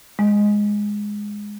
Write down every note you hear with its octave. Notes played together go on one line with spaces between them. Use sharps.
G#3